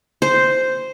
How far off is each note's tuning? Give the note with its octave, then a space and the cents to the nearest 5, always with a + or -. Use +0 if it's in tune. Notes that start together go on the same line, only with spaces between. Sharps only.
C5 -5